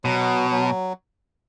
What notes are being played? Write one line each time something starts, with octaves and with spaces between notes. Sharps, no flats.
B2 F#3
F#3